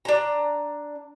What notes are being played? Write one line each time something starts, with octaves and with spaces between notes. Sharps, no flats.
D4 A#5